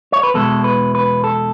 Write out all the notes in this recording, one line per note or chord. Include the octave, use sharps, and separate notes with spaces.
C#5
B4
E2 B2 G#3 A4
B4
B4
A4